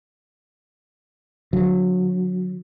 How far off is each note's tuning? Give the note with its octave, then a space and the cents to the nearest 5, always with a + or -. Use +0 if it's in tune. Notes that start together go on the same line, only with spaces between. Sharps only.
D3 +0 F#3 -20